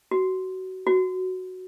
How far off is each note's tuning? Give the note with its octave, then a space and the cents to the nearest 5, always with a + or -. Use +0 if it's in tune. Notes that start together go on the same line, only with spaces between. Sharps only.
F#4 +20
F#4 +0